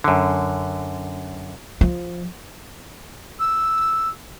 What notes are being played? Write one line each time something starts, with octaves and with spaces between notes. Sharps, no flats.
F#2 D3
F3
E6